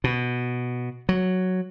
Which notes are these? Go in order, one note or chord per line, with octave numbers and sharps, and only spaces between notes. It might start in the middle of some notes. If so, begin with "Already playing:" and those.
B2
F#3